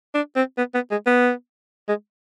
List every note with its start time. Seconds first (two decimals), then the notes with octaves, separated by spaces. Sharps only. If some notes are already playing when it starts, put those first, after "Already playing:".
0.15 D4
0.36 C4
0.58 B3
0.75 B3
0.91 G#3
1.06 B3
1.89 G#3